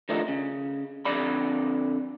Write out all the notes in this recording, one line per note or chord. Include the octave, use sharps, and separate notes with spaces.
D#3 F3 A3 D4 D#4
C#3
F2 D3 D5 B5